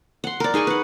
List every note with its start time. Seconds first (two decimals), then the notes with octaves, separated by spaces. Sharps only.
0.24 F#5 C6
0.40 A#4 D5
0.54 D#4 G#4 G#5 C#6
0.67 B4 F#5